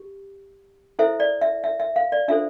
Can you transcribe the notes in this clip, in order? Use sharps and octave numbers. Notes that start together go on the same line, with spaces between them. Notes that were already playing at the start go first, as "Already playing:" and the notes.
Already playing: G4
E4 A4 C5 E5
D5
E5
E5
E5
F5
D5
D4 F4 A4 C5 E5